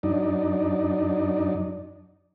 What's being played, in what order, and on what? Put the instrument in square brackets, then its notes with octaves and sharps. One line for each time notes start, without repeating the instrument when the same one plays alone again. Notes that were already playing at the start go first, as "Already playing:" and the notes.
[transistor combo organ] F#2 D4 D#4